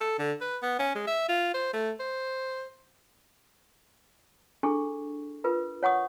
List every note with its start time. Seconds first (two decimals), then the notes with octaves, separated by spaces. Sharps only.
0.01 A4
0.19 D3
0.41 B4
0.63 B3
0.79 C#4
0.95 G#3
1.07 E5
1.29 F4
1.54 C5
1.74 A3
2.00 C5
4.63 D4 E4 G#4 A4 C#6
5.44 F4 A#4 B4
5.83 C#5 F#5 C#6 D#6